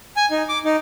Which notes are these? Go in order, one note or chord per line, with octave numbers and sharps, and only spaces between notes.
G#5
D#4
D6
D#4